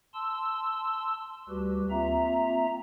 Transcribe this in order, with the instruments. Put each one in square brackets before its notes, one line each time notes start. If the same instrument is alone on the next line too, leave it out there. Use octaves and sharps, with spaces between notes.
[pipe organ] A5 C6 E6
D2 G3 F#4 G4 B4
A#3 C4 F4 E5 A#5